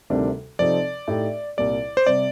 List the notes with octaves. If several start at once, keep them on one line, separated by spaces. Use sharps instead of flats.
D2 C3 D#3 G3 D4
C3 F3 C4 D#4 A4 D5
A2 A3 D#4 G4
C2 A#2 G3 D5
C5
C3 G3 D5